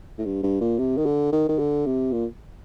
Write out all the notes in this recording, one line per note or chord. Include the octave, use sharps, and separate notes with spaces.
A2
G2
G2
A#2
C3
D#3
D3
D#3
D#3
D3
C3
A#2